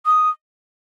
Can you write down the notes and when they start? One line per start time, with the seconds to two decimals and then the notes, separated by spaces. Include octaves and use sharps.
0.06 D#6